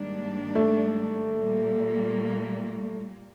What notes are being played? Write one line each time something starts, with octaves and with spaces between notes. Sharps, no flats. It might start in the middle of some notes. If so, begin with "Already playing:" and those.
Already playing: G#2 D#3 G3 A#3 D4
A3
A#2 G3 A#3